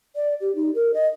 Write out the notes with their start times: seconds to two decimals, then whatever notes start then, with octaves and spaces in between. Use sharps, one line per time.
0.16 D5
0.41 G4
0.55 D#4
0.75 A#4
0.94 D#5